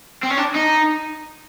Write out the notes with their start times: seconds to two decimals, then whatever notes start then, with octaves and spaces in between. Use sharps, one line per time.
0.23 C4
0.30 C#4
0.37 D4
0.54 D#4